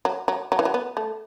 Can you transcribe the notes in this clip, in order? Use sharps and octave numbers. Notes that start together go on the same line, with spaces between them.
F#3
F#3
F#3
E3
F#3
B3
A3